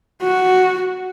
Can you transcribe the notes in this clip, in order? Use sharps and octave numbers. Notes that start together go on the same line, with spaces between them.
F#4